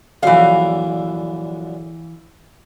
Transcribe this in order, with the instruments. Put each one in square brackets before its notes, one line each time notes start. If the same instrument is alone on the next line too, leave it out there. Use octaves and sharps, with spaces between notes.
[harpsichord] A#1 F#2 D3 [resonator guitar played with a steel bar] E3 F5